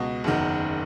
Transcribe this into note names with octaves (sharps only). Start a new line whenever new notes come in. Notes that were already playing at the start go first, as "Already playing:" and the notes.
Already playing: C#2 B2 D#5
F#1 E2 D#3